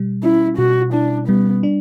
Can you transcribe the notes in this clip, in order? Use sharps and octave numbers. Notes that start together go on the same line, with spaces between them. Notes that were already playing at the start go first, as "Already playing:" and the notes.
Already playing: B2 G3
C#4 E4
B2 F#4
D4 E4
G3 B3
D4